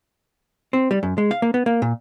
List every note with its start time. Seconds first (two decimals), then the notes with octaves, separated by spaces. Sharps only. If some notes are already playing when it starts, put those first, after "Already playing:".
0.73 C4
0.91 G3
1.03 F#2
1.18 G#3
1.31 F5
1.42 A#3
1.54 B3
1.66 A#3
1.82 A#2